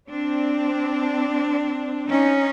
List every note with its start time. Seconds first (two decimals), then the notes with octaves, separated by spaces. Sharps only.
0.11 C4 D4
2.08 C#4 D#4